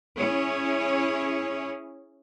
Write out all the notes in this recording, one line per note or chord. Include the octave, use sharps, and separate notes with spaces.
C#4 E4 G#4 C#5